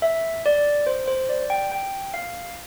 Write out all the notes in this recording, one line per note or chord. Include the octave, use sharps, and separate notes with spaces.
E5
D5
C5
C5
D5
G5
G5
F5